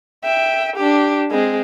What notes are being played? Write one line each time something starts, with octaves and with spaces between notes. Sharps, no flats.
E5 G5
D4 G4
G#3 C4